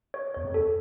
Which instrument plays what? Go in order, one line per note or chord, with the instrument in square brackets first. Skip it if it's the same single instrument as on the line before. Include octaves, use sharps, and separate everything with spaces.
[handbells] C#5
[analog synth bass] E2 [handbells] C#5
[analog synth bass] F2
[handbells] A4